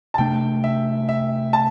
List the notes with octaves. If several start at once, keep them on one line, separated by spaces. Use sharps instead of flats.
A5
C3 A3 D4 G5
E5
E5
A5